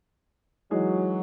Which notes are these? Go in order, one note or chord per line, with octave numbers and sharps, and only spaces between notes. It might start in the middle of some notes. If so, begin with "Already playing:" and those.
E3 F#3 G#3 D#4 G#4